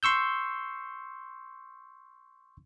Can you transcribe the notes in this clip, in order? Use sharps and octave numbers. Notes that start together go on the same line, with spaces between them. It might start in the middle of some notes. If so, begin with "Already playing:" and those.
C6 C#6 E6 G6